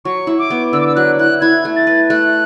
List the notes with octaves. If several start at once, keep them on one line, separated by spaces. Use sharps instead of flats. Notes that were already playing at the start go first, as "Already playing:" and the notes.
F#3 C#6
E4
D6
B3
D3 E6
D6
E6
F#3 F#6
E4 F#6
E4 G#6
A3
A6
B4
A3 F#6